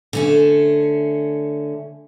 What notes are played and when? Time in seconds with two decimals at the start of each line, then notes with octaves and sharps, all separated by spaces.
0.13 D3 A3 C#4